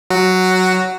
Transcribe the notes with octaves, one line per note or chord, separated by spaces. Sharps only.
F#3 F#4